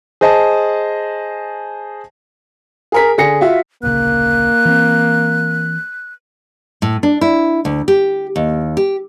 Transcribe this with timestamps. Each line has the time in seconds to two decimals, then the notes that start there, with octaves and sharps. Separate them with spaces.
0.21 G#4 C5 D#5 A5
2.92 G#4 A#4 B6
3.18 D3 G#4 A#6 C#7
3.41 F4 F#4 E5
3.83 D1 A#1 C#3 A#3 F#6
4.65 E3 C4
6.82 A2
7.03 D4
7.21 E4
7.65 D2
7.88 G4
8.36 D#2
8.77 G4